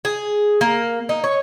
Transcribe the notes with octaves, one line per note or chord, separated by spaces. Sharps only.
G#4
A#3
D#4
C#5